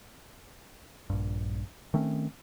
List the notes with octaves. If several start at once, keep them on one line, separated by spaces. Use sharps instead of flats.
A#1 G2
D#3 A3 C4 C#4